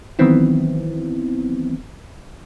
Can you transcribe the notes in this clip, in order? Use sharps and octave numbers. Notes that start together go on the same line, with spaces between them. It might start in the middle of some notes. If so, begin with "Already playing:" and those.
D#3 E3 F#3 B3 C4 E4